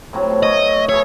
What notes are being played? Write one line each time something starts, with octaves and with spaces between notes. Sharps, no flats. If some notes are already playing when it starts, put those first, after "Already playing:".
A2 C3 F#3
B2
A3 C#5 D#5
B2 G#4 C#5 E5